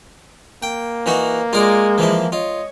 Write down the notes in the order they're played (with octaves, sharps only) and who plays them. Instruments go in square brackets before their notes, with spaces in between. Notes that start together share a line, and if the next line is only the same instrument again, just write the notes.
[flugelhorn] A#3 [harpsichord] G5
[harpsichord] E3 D#4 F#4
[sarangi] G#3 [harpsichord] F4 A#4 D5
[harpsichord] E3 F3 E4
[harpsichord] F4 [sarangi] C#5 [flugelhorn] D#5